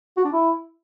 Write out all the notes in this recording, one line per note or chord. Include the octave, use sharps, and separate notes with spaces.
F#4
D4
E4